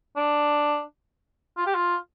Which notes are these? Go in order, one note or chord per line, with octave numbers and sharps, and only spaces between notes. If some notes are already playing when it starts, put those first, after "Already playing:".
D4
F4
G4
F4